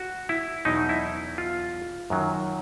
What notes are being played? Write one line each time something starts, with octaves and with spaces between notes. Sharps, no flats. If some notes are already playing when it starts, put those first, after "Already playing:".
Already playing: F#4
E4
E2 B2 F#3 D#4
E4
F4
F#2 D#3 F#3